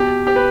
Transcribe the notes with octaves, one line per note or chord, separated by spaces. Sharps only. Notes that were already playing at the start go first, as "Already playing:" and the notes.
Already playing: B2 G4
G4
B4